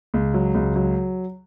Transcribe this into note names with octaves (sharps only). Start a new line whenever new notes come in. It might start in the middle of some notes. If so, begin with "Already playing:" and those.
C#2
F#3
C#2
F#3